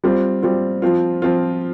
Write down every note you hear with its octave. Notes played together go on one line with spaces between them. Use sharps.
G3 C4 F4
G3 C4 F4
F3 C4 F4
F3 C4 F4